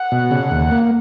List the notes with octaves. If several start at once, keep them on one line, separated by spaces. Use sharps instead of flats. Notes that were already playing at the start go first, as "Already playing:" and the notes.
Already playing: F#5
B2
C#3
D#2
A#3